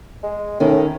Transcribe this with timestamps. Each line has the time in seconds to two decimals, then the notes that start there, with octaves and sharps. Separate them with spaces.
0.23 G#3
0.60 A2 D#3 C#4